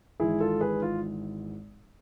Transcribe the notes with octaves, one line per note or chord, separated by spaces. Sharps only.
G#1 G#2 E3 E4 G#4
F4 A4
G#4 B4
F4